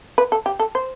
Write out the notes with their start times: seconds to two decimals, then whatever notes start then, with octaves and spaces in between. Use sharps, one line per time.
0.18 B4
0.32 A4
0.46 G4
0.59 A4
0.75 C5